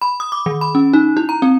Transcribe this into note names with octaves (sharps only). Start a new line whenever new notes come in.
B5
D#6
D6
D#3
B5
C#4
D#4
E4
A#5
C4